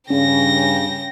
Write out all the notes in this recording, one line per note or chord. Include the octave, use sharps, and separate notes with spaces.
G2 C#3 C#4 G5 A#6